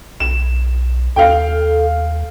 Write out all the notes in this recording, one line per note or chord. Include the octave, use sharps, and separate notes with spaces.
B1 E7
D#2 A4 F5 G5